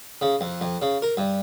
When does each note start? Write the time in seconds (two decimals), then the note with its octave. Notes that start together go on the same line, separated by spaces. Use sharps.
0.21 C#3
0.41 F2
0.61 F2
0.82 C#3
1.02 A#4
1.17 G2